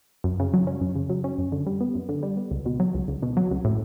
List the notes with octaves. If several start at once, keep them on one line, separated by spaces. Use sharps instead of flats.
F#2
C#3
F#3
C#4
F#2
C#3
F#3
C#4
F#2
D3
G3
B3
F#2
D3
G3
B3
C#2
B2
F#3
C#2
C#2
B2
F#3
C#2
A2